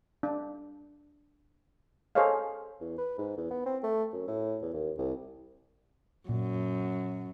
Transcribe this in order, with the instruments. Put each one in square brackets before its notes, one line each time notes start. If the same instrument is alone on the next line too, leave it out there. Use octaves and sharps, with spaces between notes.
[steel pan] D4
G#4 A4 C5 C#5 D#5 F5
[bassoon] E2
B4
G#2
E2
B3
C4
A3
F#2
A2
E2
D#2
C2
[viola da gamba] F#2 [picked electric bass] A#2